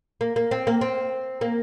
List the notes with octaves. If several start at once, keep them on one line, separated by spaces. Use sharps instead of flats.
A#3
A#3
C4
A#3
C4
A#3